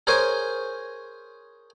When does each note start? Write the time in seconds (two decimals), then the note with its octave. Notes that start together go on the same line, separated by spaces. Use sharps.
0.07 G#4 A#4 C5 C#5 G#5